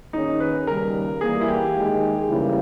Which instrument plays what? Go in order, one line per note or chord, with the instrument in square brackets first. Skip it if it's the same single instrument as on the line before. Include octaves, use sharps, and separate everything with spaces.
[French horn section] D#3 A#3 C#4 G#4 C#5 [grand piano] D#4
[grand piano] B4
[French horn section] D#2 C#3 G3 [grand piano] A#4
[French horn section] E3 G3 A#3 [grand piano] G#4
[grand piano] E4
G4
[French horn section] D#2 D#3 G#3 D#4 G#4
C#3 E3 G3 A#3 E4